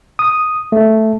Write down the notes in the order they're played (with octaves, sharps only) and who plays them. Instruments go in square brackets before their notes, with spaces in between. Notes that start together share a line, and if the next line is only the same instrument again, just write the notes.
[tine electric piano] D#6
A3